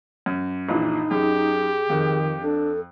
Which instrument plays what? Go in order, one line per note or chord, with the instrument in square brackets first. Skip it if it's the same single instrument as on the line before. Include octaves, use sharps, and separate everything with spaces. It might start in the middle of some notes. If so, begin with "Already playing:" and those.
[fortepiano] F#2
[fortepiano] A#1 A#2 E3 [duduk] D#4
[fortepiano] F#2 [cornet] G4 [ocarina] G#4
[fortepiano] F2 [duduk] D#3
[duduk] D4 [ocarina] A4